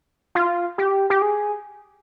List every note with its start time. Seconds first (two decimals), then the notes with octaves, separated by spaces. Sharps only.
0.35 F4
0.78 G4
1.10 G4
1.22 G#4